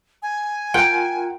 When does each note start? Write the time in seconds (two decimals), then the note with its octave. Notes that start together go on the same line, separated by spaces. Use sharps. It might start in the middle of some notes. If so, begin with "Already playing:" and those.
0.23 G#5
0.74 F4 A#4 F#5 G5